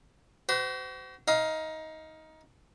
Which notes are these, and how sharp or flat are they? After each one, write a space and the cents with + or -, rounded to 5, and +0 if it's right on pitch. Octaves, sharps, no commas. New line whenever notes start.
F#4 +35 C5 -35
D#4 +20 F5 +0